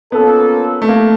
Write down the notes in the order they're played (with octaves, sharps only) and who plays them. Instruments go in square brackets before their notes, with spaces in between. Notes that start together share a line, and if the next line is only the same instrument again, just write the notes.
[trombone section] A#3 C#4 F4 A4 [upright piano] B3
[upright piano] A3
A#3